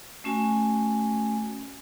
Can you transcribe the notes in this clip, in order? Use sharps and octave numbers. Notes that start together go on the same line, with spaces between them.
A3 C#4 F#4 G#5